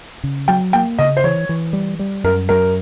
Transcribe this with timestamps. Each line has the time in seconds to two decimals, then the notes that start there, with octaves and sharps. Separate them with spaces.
0.24 C#3
0.48 F#3 G5
0.73 A#3 G5
0.98 C#3 D#5
1.17 C5
1.24 E3 C#5
1.49 E3
1.73 G3
1.99 G3
2.24 F#2 A#4
2.49 F#2 A#4